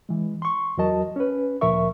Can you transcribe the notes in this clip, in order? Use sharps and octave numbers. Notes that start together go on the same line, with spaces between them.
E3 G#3
C6 C#6
E2 F#3 F#4 A#4 D#5 A5
C#4 B4
D2 A#2 F3 A#4 E5 C#6